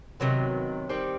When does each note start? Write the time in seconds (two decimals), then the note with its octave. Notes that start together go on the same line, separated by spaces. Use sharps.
0.20 C3 D#3 F#3 B3
0.89 D#3 G3 C4